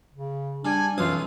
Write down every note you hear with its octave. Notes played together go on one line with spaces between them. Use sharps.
C#3
G3 D4 G#5
B1 F#2 E3 F4 D#6